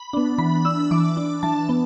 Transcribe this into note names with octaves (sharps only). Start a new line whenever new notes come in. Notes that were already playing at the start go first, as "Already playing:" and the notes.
Already playing: B5
B3 D4
E3 B5
D4 E6
E3 D6
D4
E3 A5
B3